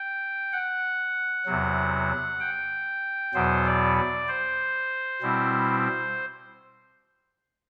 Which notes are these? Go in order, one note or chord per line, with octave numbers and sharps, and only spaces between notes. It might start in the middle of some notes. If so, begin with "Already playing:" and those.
Already playing: G5
F#5
E2 C3 F#3
G5
E2 B2 F#3 B3 C5
D5
D5
C5
B2 G3 C4 E4